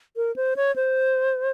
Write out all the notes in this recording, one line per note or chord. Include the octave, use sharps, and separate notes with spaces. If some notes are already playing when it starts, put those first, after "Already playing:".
A#4
C5
C#5
C5